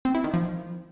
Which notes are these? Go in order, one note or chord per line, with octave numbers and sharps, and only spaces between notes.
C4
E4
D#3
F3